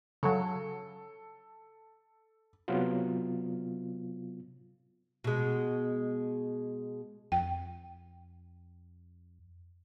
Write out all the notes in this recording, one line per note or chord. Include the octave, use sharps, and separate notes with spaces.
C#3 F#3 A4
C3 F#3 B3 F4
B2 G#3
F2 G5